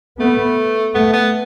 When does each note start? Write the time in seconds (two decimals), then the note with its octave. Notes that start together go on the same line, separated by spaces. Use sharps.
0.20 A3 B3
0.95 A3 B3
1.13 B3